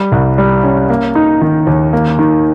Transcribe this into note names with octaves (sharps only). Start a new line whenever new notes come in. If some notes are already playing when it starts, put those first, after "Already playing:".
Already playing: G3
C2
G3
C#4
A#3
D#4
D#3
D#2
A#3
D#3